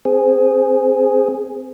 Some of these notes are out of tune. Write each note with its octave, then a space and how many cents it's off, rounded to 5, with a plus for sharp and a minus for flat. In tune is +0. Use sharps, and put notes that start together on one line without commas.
C4 -15 G#4 +0